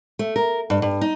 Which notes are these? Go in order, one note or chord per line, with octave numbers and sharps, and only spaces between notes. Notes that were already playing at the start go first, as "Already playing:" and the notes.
A3
A#4
G2
G2
D#4